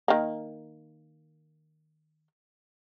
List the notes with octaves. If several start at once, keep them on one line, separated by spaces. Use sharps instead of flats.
D#3 A#3